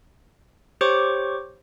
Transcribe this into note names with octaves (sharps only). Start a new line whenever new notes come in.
G4 C5 C#5 C#6 D6